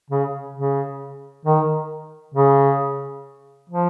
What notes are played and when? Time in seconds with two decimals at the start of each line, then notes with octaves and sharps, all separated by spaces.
0.10 C#3
0.55 C#3
1.45 D#3
2.34 C#3
3.69 F3